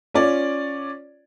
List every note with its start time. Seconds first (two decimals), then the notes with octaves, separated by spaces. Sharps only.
0.14 C#4 F4 C#5 D5